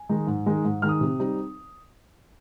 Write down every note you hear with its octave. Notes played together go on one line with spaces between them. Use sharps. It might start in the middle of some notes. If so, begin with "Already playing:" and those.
Already playing: G#5
D#3 G#3 D#4
G#2
D#3 G#3 D#4
G#2
D#3 G#3 D#4 F6
D#6
C3
G3 C4 D#4